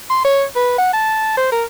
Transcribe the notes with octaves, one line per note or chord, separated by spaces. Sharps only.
C6
C#5
B4
F#5
A5
C5
A#4